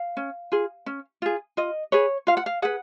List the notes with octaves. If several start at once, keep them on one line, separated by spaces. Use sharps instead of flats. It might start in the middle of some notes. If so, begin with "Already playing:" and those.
Already playing: F5
C#4
F4 G#4
C#4
F4 G#4
F4 D#5
G#4 B4 C#5
F4 F5
F#5
F5
G#4 B4 F#5